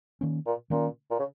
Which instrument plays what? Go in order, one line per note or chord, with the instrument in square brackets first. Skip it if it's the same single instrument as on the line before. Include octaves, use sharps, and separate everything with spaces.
[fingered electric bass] D#3 A#3 C#4
[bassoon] A#2
[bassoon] A#2 [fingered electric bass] D#3 A#3 C#4
[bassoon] A#2
C#3